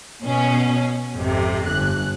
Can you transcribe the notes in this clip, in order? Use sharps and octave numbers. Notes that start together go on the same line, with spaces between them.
B2 C#4
G#1 F2 C3
G1 F#6